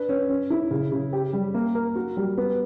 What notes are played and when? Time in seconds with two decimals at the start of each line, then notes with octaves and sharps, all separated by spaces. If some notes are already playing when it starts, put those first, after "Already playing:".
Already playing: D4 B4
0.09 C#4
0.30 C#4
0.50 E4
0.71 C#3
0.92 C#3
1.13 G4
1.33 G3
1.54 A#3
1.75 A#4
1.96 F#4
2.17 G3
2.38 B3